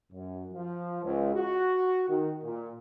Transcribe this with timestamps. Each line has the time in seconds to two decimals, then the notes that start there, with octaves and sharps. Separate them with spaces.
0.13 F#2
0.53 F3
1.03 C#2
1.34 F#4
2.09 D#3
2.44 A#2